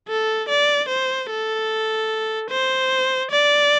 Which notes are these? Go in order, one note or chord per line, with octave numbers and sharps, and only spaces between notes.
A4
D5
C5
A4
C5
D5